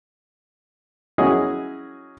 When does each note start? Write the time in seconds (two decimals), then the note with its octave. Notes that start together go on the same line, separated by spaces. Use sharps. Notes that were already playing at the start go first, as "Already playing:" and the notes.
1.18 F#3 C#4 E4 G#4 D#5 F#5